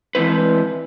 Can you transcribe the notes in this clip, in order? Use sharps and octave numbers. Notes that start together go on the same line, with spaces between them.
E3 G#3 C4 E4 B4